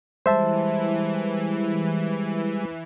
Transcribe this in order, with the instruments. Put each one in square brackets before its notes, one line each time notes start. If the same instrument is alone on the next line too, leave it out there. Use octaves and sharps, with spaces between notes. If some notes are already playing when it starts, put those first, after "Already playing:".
[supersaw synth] E3 [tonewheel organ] G3 G#3 [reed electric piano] C5 E5 A5